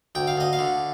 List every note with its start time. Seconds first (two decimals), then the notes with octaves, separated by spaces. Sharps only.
0.15 D2 G5
0.27 F5
0.37 D2 D#5
0.53 F5
0.59 D3